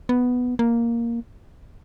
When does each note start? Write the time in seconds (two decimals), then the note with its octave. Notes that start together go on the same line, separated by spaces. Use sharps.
0.09 B3
0.59 A#3